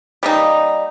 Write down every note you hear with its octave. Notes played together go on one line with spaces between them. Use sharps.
G3 A#3 D#4